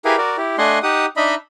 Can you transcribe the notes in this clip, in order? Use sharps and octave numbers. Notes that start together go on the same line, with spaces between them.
E4 G4 G#4 A#4 B4 F5
F#4 A#4 D5
E4 G4
A3 D4 D#5 F#5 G#5 C6
D#4 G4 F#5 D#6
D4 D#4 D#5 E5 B5